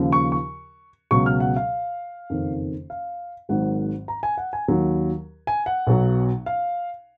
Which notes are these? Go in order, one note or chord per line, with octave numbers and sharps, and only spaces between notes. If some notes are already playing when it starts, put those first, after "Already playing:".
Already playing: D#2 C#3 F3
C#6
C#6
C#2 B2 F#3 C#6
F6
F#5
F5
F#1 F2 D#3
F5
G#1 G#2 D#3 F#3 F#5
A#5
G#5
F#5
G#5
D#2 D#3 F#3
G#5
F#5
B1 B2 F#3
F5